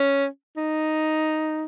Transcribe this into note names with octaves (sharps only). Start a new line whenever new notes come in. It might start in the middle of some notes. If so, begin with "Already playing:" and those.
Already playing: C#4
D#4